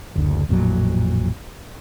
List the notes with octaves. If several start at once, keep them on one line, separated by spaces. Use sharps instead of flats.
F#1 D2
A1 F2 A#2 F#3